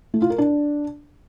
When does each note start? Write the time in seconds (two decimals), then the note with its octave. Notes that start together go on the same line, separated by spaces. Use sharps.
0.14 A3
0.22 F4
0.30 A#4
0.38 D4